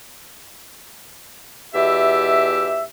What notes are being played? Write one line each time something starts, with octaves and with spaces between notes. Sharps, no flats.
E2 B2 G4 E5